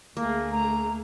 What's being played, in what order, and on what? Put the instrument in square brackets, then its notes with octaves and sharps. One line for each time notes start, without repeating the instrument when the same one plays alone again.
[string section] D2 A3 G#4 [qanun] A#3
[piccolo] A#5